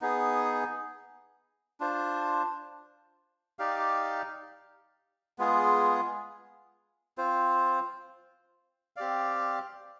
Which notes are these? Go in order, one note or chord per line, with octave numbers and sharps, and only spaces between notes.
B3 D#4 G#4
D4 F4 C5
D#4 G4 D5 F5
G#3 B3 F4 G#4
C4 F4 C5
C4 G4 D5 F5